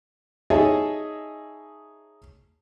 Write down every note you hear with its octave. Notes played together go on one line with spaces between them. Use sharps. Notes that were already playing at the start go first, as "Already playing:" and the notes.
D#4 G#4 C#5 D#5 E5 A5